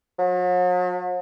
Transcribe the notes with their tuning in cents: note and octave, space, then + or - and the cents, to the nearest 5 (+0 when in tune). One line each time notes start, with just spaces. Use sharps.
F#3 -45